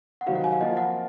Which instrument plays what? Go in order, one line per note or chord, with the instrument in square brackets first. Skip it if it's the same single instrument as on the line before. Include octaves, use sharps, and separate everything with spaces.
[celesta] F#5
[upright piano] C3 D#3 F#3 C4 F#4 [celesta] F5
[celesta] F#5
G#5
F5
[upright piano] F3 A#3 F4 [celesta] D#5
[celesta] F#5